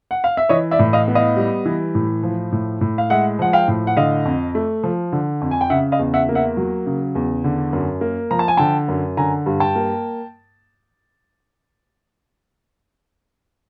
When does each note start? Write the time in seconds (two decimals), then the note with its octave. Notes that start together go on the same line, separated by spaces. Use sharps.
0.11 F#5
0.24 F5
0.37 E5
0.49 E3 C#5 D#5
0.71 D5 E5
0.79 A2
0.93 D#5 F5
1.08 B3
1.15 D#5 F5
1.36 G3
1.65 E3
1.95 A2
2.23 F3
2.52 A2
2.81 A2
2.98 F5
3.10 G#3 E5 F#5
3.39 F3 F#5
3.53 F5 G5
3.68 A2
3.87 F#5
3.97 D3 D#5 F5
4.25 F2
4.55 A3
4.84 F3
5.12 D3
5.41 F2
5.51 G#5
5.61 G5
5.70 C#3 E5 F#5
5.92 D#5 F5
5.99 E2
6.14 E5 F#5
6.29 A#3
6.35 E5 F#5
6.57 F#3
6.86 C#3
7.15 E2
7.44 D3
7.73 F#2
8.01 A#3
8.31 F3 A#5
8.39 A5
8.48 G#5
8.57 D3 G5 A5
8.88 F#2
9.17 D3 G#5 A#5
9.46 G2
9.60 G5 A5
9.75 A#3